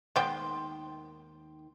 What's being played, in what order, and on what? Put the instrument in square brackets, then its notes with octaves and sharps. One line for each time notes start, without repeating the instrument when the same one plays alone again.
[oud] D#2 D#3 C5 [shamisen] G#3 B3 G5 [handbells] C6